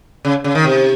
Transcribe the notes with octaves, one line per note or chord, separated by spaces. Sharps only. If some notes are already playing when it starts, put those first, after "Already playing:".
C#3
C#3
D#3
C3